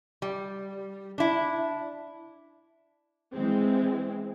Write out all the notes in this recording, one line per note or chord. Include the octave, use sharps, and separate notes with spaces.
G3
D4 E4
E3 G#3 C4